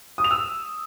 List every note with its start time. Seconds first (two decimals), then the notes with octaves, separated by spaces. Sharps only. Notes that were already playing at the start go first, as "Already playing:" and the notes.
0.18 D#6
0.24 F7
0.31 E6